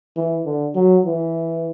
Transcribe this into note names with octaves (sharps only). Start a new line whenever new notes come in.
E3
D3
F#3
E3